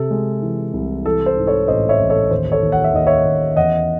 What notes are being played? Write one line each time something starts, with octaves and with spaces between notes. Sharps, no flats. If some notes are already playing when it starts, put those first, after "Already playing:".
Already playing: C3 A4
G#3
E3
C2
E3 A4
C5
G#2
A4 C#5
A1 C5 D#5
C#5 E5
A1
A4 C#5
D#2 C5
A4 C#5
D#2
F#5
E5
D#2 D#5
C#5 E5
D#2
E2 D#5 F#5